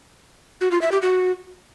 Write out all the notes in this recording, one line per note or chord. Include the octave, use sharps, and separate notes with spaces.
F#4
F4
E5
G4
F#4